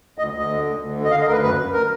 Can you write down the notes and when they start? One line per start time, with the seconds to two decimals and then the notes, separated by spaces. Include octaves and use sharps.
0.18 D2 D#5
0.34 D2 D#5
0.49 D3
0.64 D2
0.80 D2
0.96 D3
1.05 D#5
1.11 D3 F5
1.21 D#5
1.27 D2 A#4
1.32 B4
1.42 F#2 B4
1.58 F#2
1.73 A#4